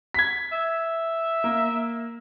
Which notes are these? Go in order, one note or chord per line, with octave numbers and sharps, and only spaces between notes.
G#6 B6
E5
A#3